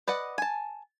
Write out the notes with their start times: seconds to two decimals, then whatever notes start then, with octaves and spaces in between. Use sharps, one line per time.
0.08 B4 D5 D#5 F#5
0.38 G#5 A5